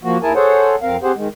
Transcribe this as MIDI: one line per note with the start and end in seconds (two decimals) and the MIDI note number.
0.04 0.18 53
0.04 0.18 58
0.04 0.18 66
0.23 0.33 39
0.23 0.33 64
0.23 0.33 68
0.23 0.33 70
0.23 0.33 80
0.23 0.33 81
0.35 0.76 68
0.35 0.76 69
0.35 0.76 72
0.35 0.76 73
0.35 0.76 78
0.82 0.97 41
0.82 0.97 60
0.82 0.97 70
0.82 0.97 77
1.03 1.12 60
1.03 1.12 67
1.03 1.12 68
1.03 1.12 72
1.03 1.12 78
1.16 1.28 51
1.16 1.28 56